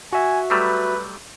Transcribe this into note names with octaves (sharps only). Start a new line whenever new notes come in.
F#4 E5 G#5
F#3 G3 A3 B4